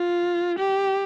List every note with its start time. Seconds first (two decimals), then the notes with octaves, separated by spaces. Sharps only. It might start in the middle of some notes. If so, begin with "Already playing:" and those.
Already playing: F4
0.59 G4